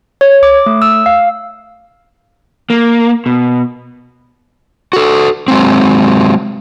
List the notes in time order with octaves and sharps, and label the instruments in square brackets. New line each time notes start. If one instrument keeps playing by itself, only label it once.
[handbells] C#5
D6
A3
E6
F5
[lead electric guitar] A#3
B2
[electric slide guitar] F#4 A4
F#3 G#3 C4